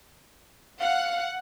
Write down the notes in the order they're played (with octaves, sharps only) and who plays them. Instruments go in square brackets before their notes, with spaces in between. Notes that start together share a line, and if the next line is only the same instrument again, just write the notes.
[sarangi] F5 [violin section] F#5